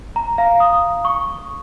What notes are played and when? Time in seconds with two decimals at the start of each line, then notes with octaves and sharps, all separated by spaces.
0.16 A#5
0.38 F5
0.60 D#6
1.05 C#6